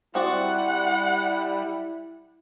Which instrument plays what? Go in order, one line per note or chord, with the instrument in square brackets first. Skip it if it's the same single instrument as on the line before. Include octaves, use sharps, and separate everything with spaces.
[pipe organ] G3 [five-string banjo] C4 F#4 D5 [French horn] E4 [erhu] F#5